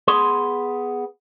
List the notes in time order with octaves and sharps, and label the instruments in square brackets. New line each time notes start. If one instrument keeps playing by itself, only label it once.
[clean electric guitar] B3 G#4 C6